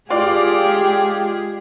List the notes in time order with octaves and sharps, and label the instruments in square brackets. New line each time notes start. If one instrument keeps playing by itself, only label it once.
[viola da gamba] G#3 G4 G#4 [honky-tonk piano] F4 D5 [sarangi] G5